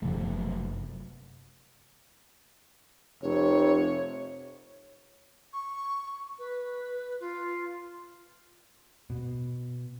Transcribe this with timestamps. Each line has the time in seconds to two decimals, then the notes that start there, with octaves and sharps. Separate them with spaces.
0.02 F#1 B1 F#2 C3 F3 A3
3.22 F1 C#5
5.53 C#6
6.39 B4
7.20 F4
9.10 B2